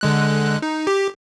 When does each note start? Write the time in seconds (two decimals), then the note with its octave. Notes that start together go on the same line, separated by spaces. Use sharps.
0.01 D3 G#3 F#6
0.62 D#4
0.87 G4